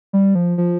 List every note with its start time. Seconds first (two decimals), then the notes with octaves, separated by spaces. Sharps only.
0.13 G3
0.35 F3
0.58 F3